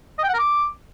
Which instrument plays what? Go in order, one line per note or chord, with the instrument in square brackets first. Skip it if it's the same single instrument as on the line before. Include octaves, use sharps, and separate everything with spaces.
[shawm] D#5
G5
F#5
A#4
D6